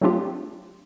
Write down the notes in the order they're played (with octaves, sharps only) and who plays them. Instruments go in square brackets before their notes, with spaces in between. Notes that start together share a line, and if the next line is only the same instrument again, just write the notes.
[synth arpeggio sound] F#3 A3 C4 D4 F4 G4